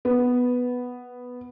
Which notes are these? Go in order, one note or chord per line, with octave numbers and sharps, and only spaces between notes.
B3